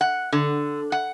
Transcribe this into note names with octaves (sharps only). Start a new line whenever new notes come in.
F#5
D3
F#5